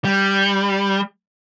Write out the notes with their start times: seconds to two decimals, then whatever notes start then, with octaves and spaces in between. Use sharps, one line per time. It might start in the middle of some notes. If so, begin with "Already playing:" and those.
0.05 G3